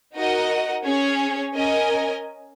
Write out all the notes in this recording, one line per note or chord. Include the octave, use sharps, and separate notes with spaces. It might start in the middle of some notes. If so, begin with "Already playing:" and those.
D#4 F#4 A#4 D#5 F#5
C#4 G#4 C#5
C#4 A#4 D#5 G#5